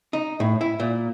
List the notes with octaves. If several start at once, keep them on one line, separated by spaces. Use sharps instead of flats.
D#4
A2
E4
A#2